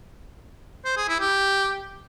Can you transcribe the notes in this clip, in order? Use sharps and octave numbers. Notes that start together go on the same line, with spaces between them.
C5
G#4
E4
G4